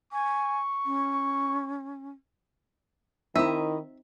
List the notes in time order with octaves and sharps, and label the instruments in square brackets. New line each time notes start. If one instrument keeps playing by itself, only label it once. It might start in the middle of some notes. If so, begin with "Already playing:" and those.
[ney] G#5 [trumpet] C#6
[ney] C#4
[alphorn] D#3 [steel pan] C4 D#4 [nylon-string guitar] E4 D#5 [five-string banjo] E5